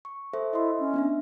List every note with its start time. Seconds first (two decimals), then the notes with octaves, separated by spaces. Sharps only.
0.05 C#6
0.33 A4 C5 E5
0.53 E4 D#5 E5 C6
0.80 C#4
0.94 B3 D4 E5